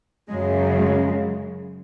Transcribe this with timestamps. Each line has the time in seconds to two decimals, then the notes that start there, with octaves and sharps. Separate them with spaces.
0.29 F#2 C#3 F#3 G#3
0.78 G#3